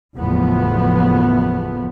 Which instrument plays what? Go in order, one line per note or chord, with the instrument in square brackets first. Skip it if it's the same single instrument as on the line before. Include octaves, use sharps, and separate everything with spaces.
[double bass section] F#1 E2 A2 F3 B3